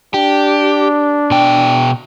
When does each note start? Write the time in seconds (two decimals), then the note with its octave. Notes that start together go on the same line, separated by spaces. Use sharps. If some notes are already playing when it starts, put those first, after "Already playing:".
0.14 D4 G4
1.31 B2 G5